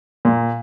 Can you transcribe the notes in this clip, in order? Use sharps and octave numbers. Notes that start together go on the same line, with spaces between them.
A#2